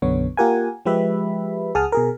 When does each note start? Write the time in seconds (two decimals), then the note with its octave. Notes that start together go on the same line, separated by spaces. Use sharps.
0.02 B1 F#2 D3 B3 C#5
0.37 A#3 F4 G4 A#4 F#5 G#5
0.86 F3 G#3 G4 B4 E5 B5
1.75 C#2 G#4 F#5 A5 D#6 F6
1.92 B2 G#4 A#4